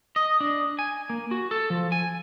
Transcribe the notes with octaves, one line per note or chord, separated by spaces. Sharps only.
D#5
D4
G#5
A#3
F#4
A4
F3
G#5